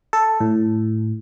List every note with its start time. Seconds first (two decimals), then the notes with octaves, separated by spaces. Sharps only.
0.13 A4
0.41 A2